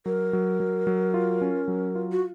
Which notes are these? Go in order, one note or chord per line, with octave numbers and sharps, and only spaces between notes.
F#3 A#4
F#3
F#3
F#3
F4
C#4
F#3
F4
F#4